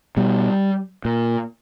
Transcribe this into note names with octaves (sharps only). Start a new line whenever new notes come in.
B2 G3
A#2